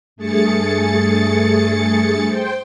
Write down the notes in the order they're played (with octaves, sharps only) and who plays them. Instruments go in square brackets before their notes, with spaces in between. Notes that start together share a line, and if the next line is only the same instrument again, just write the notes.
[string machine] G2 A3 G#4 A6 C#7
C5 G5